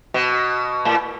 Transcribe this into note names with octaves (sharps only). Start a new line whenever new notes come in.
B2
A2